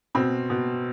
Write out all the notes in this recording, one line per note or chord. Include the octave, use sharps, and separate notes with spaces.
B2 C4
B2